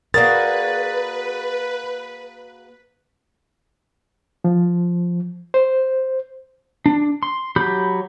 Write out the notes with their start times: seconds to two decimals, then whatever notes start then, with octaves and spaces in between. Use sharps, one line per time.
0.14 A#3 F#4 G#4 A#4 B4 D5 A6
4.44 F3
5.54 C5
6.86 D4
7.23 C6
7.56 F#3 G4 B5 G6